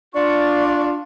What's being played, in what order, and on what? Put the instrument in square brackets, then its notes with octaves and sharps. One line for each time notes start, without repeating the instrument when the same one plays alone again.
[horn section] D4 F4 [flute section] D5 C#6